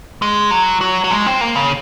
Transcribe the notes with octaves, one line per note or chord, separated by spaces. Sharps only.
G#3
F#3
F#3
F#3
G#3
C4
A#3
C#3